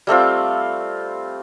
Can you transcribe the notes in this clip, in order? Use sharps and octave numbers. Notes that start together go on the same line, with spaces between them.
G3 A3 C4 F4